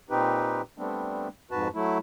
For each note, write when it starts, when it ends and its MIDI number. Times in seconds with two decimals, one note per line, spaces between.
0.10 0.61 46
0.10 0.61 60
0.10 0.61 63
0.10 0.61 67
0.10 0.61 71
0.78 1.28 55
0.78 1.28 57
0.78 1.28 59
0.78 1.28 60
0.78 1.28 62
1.51 1.68 41
1.51 1.68 44
1.51 1.68 66
1.51 1.68 71
1.51 1.68 81
1.75 1.98 54
1.75 1.98 57
1.75 1.98 64